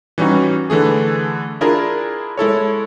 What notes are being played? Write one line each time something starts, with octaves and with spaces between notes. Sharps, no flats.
E3 G3 C#4 D#4 F#4
D3 E3 A3 G#4
D4 E4 F4 G#4 A#4
G#3 E4 A4 C#5